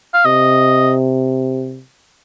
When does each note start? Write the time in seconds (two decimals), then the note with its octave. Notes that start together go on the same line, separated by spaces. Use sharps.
0.14 F5
0.25 C3 D#5